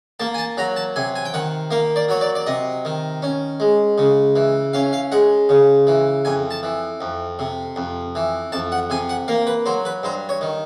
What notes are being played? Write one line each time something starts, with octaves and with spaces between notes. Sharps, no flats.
A#3 A5
G#5
A5
F#3 A#5
A5
C3 G#5
G#5
G5
D#3 F#5
A#3 F5
D5
F#3 C#5
D5
D5
C3 D#5
D#3
C#4
G#3
C#3
E3
C#4 F5
F5
G#3 F#5
C#3
E3
F2 G#5
A5
E3
F2
C3
F2
E3
F2 A5
F#5
C3 G#5
F#5
A#3 F5
B4
F#3 C5
B4
G2 C5
C#5
D#3